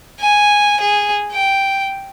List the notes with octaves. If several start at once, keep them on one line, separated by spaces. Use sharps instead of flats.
G#5
G#4
G5